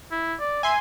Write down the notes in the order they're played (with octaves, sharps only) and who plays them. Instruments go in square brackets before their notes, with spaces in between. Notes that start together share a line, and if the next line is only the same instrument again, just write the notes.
[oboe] E4
D5
[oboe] E5 [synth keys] G#5 C6